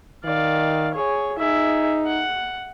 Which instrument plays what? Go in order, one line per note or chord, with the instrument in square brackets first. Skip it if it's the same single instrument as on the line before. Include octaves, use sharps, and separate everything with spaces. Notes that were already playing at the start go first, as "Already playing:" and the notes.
[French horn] D#3 [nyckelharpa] D5 F5
[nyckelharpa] G#4 C#5
[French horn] D#4 [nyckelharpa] G#4 E5
[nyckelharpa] F#5